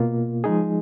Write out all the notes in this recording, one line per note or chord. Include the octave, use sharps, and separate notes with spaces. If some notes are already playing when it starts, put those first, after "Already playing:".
Already playing: B2 A#3 F4
F3 G#3 D#4 G#4